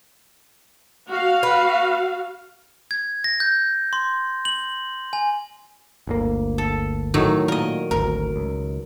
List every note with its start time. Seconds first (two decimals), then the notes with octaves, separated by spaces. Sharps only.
1.09 F#4 F5
1.43 B4
2.91 G#6
3.24 A#6
3.40 G6
3.93 C6
4.45 F#7
5.13 G#5
6.07 G1 D2 A#3
6.58 A4
7.14 A2 D#3 F#3
7.48 A#2 A#4 D#5
7.91 G#1 D2 A#4
8.36 C#2